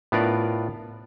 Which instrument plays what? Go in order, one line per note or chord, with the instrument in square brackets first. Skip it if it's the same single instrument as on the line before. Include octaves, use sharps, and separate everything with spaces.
[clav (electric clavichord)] A2 B3 D4 F4 A#4 D5